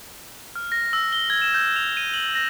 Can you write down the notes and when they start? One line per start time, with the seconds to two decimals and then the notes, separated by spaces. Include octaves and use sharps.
0.56 F6
0.72 A#6
0.93 E6
1.12 G7
1.30 G#6
1.42 E7
1.54 G6
1.76 F7
1.97 D#7
2.14 F#7
2.35 A#6